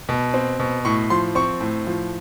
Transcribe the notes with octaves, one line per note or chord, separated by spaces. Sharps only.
B2
C4
B2
A2 C#6
F3 C6
C4 C#6
A2
F3